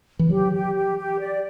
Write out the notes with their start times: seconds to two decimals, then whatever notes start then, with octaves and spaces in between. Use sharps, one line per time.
0.19 E3
0.29 F#3 G4
0.52 G4
0.75 G4
0.97 G4
1.19 D5